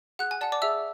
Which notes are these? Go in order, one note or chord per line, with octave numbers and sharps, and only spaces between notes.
G#4 F#5 F#6
G#5
D5 F#5 A5
D5 D6
G#4 E5 E6